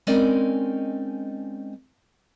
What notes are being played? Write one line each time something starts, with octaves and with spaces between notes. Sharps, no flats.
G#3 C4 C#4 D#4 A#4 D5